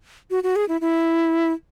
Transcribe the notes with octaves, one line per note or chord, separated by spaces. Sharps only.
F#4
F#4
G#4
E4
E4